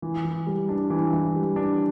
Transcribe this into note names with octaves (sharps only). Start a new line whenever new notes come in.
E3
E3
G3
D4
E3
E3
G3
D4